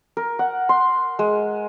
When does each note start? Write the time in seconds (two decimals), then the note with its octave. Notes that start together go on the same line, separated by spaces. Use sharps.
0.17 A#4
0.39 F#5
0.69 C6
1.19 G#3